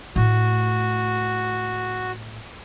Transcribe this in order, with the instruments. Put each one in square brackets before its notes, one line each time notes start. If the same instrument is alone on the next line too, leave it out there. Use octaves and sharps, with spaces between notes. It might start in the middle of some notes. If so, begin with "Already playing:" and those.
[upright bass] A2 [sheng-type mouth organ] F#4